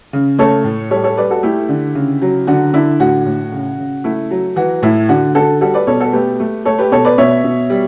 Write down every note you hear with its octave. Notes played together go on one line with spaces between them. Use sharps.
C#3
A3 A4 C#5
A2
G3 A4 C#5
A4 C#5
G3 B4 D5
F#4 A4
A3 E4 G4
D3
C#3
F#3
D3 F#4
D3 E4
A2 F#4
A2
C#3
C#3
A3 E4
F#3
E3 F#4
A2 E4
D3 F#4
D3 F#4 A4
G3 F#4 A4
B4 D5
B2 A4 C#5
F#4 A4
A3 G4 B4
A3
A3 A4 C#5
G4 B4
B2 A4 C#5
B4 D5
B2 C#5 E5
B2
G3